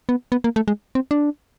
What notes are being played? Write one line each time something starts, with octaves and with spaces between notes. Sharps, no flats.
B3
B3
A#3
A3
G#3
C4
D4